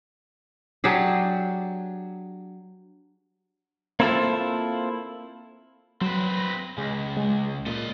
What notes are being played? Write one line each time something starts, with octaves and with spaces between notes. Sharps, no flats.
F#3 D4 G4 G#4
A#3 C4 E4 F4 A4 C5
F#3 C4 B4
A#6
C#2 G#3
G#3
A#2 A4 D#5